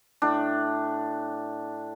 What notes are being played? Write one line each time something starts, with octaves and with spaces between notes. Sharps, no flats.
A2 D4